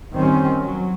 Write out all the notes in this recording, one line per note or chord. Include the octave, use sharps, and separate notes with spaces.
D#3 G3 C4 C#4
F#3